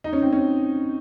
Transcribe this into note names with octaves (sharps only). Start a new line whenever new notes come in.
D#4
C#4
C4
C#4